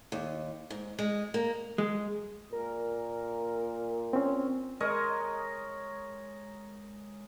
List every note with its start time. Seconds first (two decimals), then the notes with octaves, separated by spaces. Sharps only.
0.12 D#2
0.70 G#2
0.99 G#3
1.34 A#3
1.78 G#3
2.52 A#2 A#4
4.13 C4 C#4
4.80 G#3 A#4 C#5 D#5